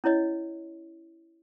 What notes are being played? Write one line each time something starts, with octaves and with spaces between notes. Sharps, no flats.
C#4 E4 C#5 D#5